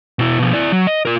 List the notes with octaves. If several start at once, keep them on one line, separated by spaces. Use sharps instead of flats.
B2 E4
B2 F3
E4 D5
F#3
D#5
F4 A#4